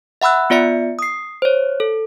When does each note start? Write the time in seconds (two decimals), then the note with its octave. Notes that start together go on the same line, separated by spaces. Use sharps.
0.22 E5 F#5 B5 E6 F#6
0.50 B3 F4 D5 E5 C#7
0.99 D#6 C7
1.42 C5 C#5
1.80 A4